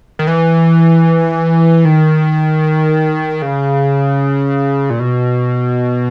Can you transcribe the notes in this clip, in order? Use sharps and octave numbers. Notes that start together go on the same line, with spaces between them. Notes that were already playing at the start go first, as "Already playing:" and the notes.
D#3
E3
D#3
C#3
A#2
B2